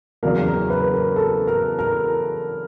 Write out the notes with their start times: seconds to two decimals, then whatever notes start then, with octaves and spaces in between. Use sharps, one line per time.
0.23 E2 C#3 F#3 A#3 A#4
0.46 A#4
0.70 B4
0.94 A#4
1.16 A4
1.47 A#4
1.79 A#4